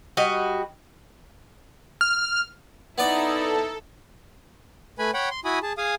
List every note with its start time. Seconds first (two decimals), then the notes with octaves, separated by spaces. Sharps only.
0.17 G3 F#4 D#5
2.01 F6
2.98 B3 D#4 E4 A4 D5
4.99 A3 B4 G#5 B5
5.14 C#5 F#5 G5 B5
5.31 C6
5.45 E4 F#4 G#5 B5 D#6
5.63 G#4 A5
5.78 G#4 F5 G#5 D#6